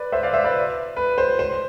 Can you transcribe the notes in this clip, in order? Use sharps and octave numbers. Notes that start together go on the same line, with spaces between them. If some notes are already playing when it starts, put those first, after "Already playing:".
Already playing: B4 D5
C5 E5
D5 F5
C5 E5
B4 D5
B4
C5
C5